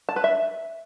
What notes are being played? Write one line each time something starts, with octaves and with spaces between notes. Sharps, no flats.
A5
B4
E5